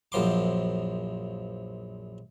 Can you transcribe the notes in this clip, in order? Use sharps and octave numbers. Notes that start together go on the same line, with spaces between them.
A#1 F#2 F3 C6 D6